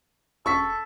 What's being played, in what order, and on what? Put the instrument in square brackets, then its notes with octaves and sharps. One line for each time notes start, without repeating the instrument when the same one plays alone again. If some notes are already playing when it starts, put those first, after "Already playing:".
[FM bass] E1 [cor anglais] A4 [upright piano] C#6 B6